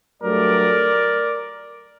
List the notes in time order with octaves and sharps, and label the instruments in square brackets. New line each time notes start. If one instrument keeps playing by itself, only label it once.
[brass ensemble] G2 F#3 A3 A#4 D5